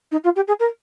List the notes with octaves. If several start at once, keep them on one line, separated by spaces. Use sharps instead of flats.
D#4
F4
G4
G#4
A#4